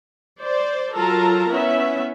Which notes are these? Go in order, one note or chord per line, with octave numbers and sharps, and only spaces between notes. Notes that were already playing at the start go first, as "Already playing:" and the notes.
C5 D5
F#3 F4 A4 A#4 A5 A#5
B3 C#4 E4 E5